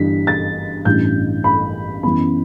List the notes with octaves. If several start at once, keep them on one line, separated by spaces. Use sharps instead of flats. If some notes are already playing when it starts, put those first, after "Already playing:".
Already playing: G1 G2 E3 G3 D4 B6
A6
A1 G2 E3 G6
B5
F#2 E3 B3 B5